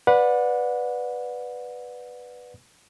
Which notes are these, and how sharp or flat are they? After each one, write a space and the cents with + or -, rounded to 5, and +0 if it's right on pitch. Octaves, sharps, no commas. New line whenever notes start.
B4 +0 D5 +0 F#5 -30